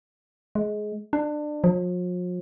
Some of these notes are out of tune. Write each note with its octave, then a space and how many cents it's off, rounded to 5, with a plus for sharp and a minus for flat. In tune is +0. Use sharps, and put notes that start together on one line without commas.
G#3 +20
D4 +25
F3 +45